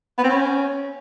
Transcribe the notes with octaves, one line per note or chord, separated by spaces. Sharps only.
B3
C4
C#4